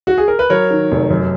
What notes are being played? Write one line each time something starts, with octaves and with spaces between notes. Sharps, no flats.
F#4
G#4
A#4
B4
F#3 A#4 C#5
D#3
F1
F#2